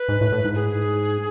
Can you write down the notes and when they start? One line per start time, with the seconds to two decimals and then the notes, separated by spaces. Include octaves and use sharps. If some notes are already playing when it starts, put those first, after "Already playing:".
Already playing: B4
0.09 G#2
0.21 A2
0.32 A2
0.44 G#2
0.55 G#4